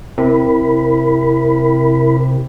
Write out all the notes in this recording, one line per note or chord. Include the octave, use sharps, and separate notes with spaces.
C3 E4 A#4 B5